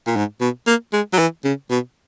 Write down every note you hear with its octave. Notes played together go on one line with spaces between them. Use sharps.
A#2
G#2
B2
A#3
G#3
F#3
E3
C#3
B2